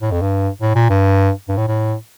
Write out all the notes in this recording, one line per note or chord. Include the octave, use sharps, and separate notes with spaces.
A2
F2
G2
A2
A#2
G2
G2
A2
A2